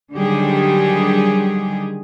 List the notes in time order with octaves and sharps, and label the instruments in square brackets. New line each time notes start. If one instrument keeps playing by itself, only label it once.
[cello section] D3 D#3 F#3 G3 G4 G#4